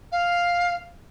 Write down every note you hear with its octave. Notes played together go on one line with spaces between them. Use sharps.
F5